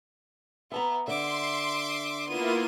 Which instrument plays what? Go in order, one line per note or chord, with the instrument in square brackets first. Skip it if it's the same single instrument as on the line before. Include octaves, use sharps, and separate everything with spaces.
[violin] B3 [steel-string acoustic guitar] E5 A5 A#5
[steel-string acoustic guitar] D3 [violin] E5 D6 [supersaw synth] C6
[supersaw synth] A#3 E4 F4 [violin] B3 D#7